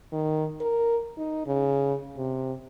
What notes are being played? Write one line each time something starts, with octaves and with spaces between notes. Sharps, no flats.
D#3
A#4
D#4
C#3
C3